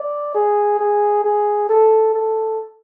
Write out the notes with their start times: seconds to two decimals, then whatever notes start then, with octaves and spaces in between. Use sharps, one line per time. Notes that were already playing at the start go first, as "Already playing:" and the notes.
Already playing: D5
0.35 G#4
0.79 G#4
1.24 G#4
1.69 A4
2.14 A4